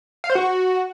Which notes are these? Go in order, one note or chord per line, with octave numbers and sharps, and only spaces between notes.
F5
C5
F#4